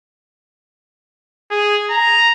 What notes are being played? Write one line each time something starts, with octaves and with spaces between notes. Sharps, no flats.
G#4
A#5